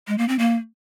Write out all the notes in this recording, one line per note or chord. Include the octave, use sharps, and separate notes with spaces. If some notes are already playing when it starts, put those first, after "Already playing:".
G#3
A#3
C4
A#3